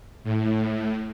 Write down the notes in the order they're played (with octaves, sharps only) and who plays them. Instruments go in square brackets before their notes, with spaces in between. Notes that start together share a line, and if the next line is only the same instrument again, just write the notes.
[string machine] A2